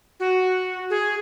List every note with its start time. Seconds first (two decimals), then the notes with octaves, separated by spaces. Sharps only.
0.20 F#4
0.90 G#4